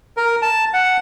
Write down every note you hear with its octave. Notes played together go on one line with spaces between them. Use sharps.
A#4
A5
F#5